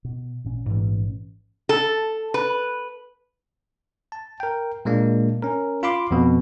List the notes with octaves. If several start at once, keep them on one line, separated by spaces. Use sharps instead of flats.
B2
A1 A#2 C#4
G#2 E3
A4
B4
A5
A#4 G5
A#2 G#3 A#3 D4
C#4 A#4
F4 F5 B5 C6 D6
F2 B2